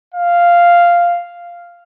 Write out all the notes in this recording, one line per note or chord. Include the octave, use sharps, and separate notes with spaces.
F5